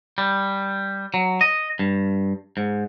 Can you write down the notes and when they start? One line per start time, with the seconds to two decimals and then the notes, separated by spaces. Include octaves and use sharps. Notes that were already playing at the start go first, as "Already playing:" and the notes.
0.18 G3
1.14 F#3
1.41 D#5
1.79 G2
2.57 G#2